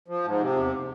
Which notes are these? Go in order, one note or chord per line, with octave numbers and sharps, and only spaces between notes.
F3
G#2
C3
E2